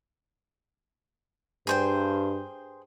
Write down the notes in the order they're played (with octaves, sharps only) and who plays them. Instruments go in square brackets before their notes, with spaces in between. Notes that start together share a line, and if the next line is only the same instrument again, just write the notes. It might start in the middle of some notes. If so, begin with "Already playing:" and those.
[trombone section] G2 [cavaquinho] G#4 C5 G5